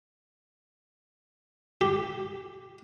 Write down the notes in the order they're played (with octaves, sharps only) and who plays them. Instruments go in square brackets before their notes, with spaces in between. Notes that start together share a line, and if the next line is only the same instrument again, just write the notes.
[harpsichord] G4